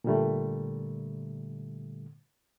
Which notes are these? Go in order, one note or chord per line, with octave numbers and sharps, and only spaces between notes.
A#2 D3 G3 A3